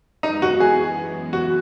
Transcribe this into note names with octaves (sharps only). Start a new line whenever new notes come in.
F#2 E3 G#3 B3 D#4
F#4
G#4
F#4